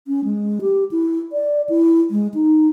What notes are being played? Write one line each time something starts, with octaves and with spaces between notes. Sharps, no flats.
C#4
G#3
G4
E4
D5
E4
G#3
D#4